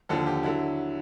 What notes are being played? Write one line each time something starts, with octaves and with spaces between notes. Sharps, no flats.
D#2 D3 F3 A4
G4
D3 F#3 E4